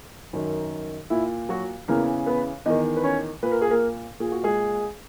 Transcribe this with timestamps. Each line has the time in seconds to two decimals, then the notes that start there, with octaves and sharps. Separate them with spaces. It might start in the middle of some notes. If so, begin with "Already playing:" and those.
0.33 F#2 D#3
1.10 A#2 E4
1.49 F#3 F#4
1.88 E2 C#3 E3 A#3 A#4
2.26 B3 B4
2.66 E2 D#3 D#4 D#5
2.97 B4
3.04 C#4 C#5
3.43 A#2 B4
3.52 A#4
3.62 G#4
3.70 A#3 A#4
4.20 A#2 G#4
4.32 F#4
4.44 G#3 G#4